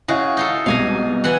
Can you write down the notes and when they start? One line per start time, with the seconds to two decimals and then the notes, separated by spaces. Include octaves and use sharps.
0.08 C#3 E4 F#4 G#4 D#5 F5
0.37 D#4 F4 A4
0.66 C2 G#2 B2 F5 G#5 A#5
1.24 E3 F#5 G#5